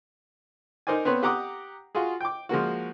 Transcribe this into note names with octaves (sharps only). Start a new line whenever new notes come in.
D#4 A#4 C5 D5 G#5
B3 C4 B4 C#5
G4 F#5 A#5 D6 D#6
F4 F#4 G#4
G5 D6
F3 G#3 A#3 F#4